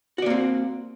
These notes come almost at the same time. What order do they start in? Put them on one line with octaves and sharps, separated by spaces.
F#4 D5 A#3 C4